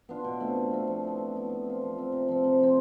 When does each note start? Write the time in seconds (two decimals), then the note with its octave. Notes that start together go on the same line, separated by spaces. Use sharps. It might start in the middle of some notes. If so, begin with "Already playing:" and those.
0.09 B3 D4 F4
0.24 B2
0.40 A3 C4 F4
0.56 B2
0.71 A3 C4 F4
0.87 F3
1.03 B3 E4
1.18 F3
1.34 B3 E4
1.49 F3
1.66 C4 F4
1.81 F3
1.97 C4 F4
2.12 C3
2.28 F3 C4
2.44 C3
2.60 F3 C4